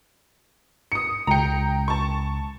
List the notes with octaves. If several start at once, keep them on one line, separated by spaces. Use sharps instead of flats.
D#6 C#7
C#2 G5 A#5 C#7
A5 C#6